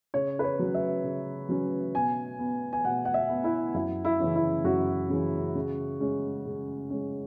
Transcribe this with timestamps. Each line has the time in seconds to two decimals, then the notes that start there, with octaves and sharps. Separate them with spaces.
0.14 C#3 C#5
0.39 B4
0.44 C#5
0.59 F#3 C#4
0.74 E5
1.04 C#3
1.49 F#3 C#4
1.95 B2 G#5
2.39 B3
2.73 G#5
2.85 B2 F#5
3.05 F#5
3.14 E5
3.29 B3
3.44 E4
3.74 F#2 E4
4.05 E4
4.20 C#3 E3 C#4
4.35 E4
4.64 F#2 F#4
5.09 C#3 E3 C#4
5.55 C#3
6.00 G#3 C#4
6.46 C#3
6.90 G#3 C#4